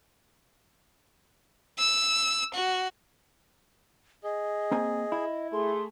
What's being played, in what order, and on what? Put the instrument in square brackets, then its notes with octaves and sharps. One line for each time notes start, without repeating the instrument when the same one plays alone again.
[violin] E6
F#4
[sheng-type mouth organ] G#4 [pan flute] D#5
[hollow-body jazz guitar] A#3 C4 G#5
E4
[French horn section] A3 G#4 [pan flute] C6